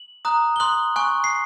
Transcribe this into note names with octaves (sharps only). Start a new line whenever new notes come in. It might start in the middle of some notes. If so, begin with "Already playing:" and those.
Already playing: F#7
A#5 D#6 F#6
G7
C6 D#6 F#6 F#7
G#5 C#6 F#6
C7